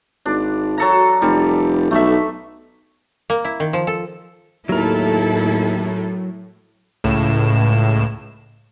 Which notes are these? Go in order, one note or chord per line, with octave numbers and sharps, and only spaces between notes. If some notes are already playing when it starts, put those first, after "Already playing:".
G#1 D4
F#3 A4 A#5
F1 G3
B1 A3 E5
A#3
E4
D#3
F3
A4
D#2 A2 F#3 E4 A4 A#4
C#2 A2 E7